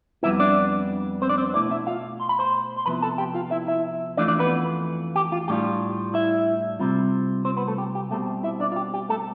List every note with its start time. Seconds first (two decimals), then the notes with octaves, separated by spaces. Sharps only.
0.23 F2 C3 G3 B3 E4 E5
0.40 D4 D5
1.22 C4 C5
1.29 D4 D5
1.38 C4 C5
1.54 B2 A3 D4 E4 D5
1.71 E4 E5
1.87 F4 F5
2.20 C6
2.29 B5
2.39 C5 C6
2.76 C6
2.86 C3 F3 B3 E4 B4 B5
3.02 A4 A5
3.18 G4 G5
3.35 F4 F5
3.51 E4 E5
3.67 E4 E5
4.17 F2 E3 A3 D4 F4 D5
4.28 D4 D5
4.39 B3 B4
5.16 G4
5.32 F4
5.48 A2 G3 D4 F4 G4
6.14 E4 E5
6.79 C3 G3 C4 F4
7.45 C4 C5
7.57 B3 B4
7.68 A3 A4
7.78 G4
7.95 G4
8.10 B2 G3 A3 C4 A4
8.43 E4 E5
8.60 D4 D5
8.72 F4
8.76 G4
8.94 G4
9.09 A3 A4